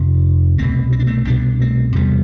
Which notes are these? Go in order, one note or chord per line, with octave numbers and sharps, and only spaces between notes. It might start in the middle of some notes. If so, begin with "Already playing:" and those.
Already playing: F2 C3
C2 B2 A3 C4
C4
D4
A3 C4
C2 B2 B3 D4
A3 C4
E2 C3 G3 B3